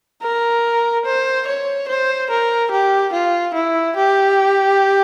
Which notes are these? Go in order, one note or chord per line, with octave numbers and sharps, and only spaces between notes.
A#4
C5
C#5
C5
A#4
G4
F4
E4
G4